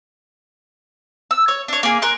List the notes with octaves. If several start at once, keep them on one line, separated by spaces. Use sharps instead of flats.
E6
C#5
D4 C#5
A#3 G#4
A#4 C6 F#6